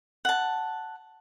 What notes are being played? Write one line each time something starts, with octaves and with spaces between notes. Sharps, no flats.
F#5 A5